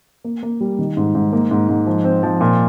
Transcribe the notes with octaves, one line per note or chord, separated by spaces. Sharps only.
A#3
A#3
G3
D#3
G#2
G#2
A#3
G#2
G#2
F3
C4
F3
A#2